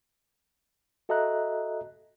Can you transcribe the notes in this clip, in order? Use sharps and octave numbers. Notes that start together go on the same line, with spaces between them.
F#4 A4 D#5 E5 A#5 F#6